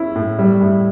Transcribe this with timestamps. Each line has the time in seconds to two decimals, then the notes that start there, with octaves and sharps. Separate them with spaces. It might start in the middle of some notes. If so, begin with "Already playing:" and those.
Already playing: C#4 E4
0.15 A2
0.39 G3
0.61 A2